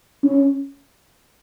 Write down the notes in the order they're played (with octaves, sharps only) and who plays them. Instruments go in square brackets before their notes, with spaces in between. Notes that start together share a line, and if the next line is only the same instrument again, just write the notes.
[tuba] C#4